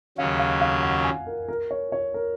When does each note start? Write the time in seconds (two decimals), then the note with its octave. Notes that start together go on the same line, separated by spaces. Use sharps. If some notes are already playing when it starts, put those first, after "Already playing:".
0.18 D#2 C#3 F#3 C#4 F5
0.39 F5
0.61 F5
0.83 F#5
1.04 G#5
1.27 A#4
1.49 A#4
1.71 C#5
1.92 C#5
2.14 A#4